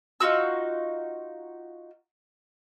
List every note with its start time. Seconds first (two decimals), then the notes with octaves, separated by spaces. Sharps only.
0.20 D#4 F4 F#4 E6